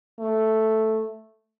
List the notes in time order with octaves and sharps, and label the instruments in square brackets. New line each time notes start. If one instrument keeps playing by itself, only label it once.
[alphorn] A3